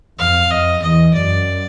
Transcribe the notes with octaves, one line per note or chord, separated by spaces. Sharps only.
F2 F5
F2 D#5
E2 D#5
F#2 D5